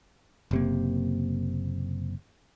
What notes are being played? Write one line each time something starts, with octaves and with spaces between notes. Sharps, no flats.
F#1 C3 A#3